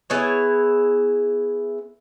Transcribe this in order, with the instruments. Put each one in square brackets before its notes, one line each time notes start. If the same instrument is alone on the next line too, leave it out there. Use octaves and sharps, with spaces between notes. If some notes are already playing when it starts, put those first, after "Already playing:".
[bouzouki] B3 E4 G#4 C#5